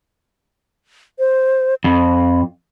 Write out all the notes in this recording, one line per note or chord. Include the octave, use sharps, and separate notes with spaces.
C5
F2 B5